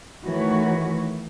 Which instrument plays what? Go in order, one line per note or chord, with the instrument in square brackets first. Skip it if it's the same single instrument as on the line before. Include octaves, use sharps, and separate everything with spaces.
[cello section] D#3 E3 A3 F#4 B4 C#5